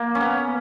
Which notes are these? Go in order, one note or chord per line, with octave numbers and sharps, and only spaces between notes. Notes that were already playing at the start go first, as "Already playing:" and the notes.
Already playing: A#3
C#4
B3